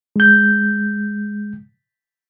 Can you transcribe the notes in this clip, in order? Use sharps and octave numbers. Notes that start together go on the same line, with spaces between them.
G#3 G6